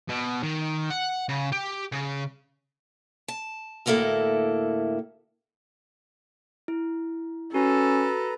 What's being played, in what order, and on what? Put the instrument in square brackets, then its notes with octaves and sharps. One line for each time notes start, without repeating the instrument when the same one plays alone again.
[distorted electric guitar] B2
D#3
F#5
C#3
G4
C#3
[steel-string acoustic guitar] A5
D2 A2 A#3 E4 A4
[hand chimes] E4
[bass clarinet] C#4 [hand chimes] F#4 [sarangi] A4 [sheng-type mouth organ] B4 A#5